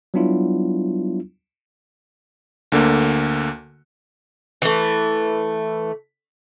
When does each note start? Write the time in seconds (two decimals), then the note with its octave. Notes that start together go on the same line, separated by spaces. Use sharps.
0.14 F#3 G3 B3 D4 E4 F4
2.72 D2 D3 A#3
4.62 E3 A3